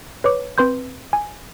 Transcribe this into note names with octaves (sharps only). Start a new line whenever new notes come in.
B4 C#5 D6
C4 B4 C6 G6
G#5